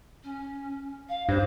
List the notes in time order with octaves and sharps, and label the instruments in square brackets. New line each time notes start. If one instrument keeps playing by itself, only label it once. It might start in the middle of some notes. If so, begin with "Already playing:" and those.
[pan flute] C#4
F5
[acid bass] G2 [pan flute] C5